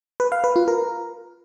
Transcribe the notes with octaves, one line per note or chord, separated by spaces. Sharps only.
B4
F5
B4
F4
A#4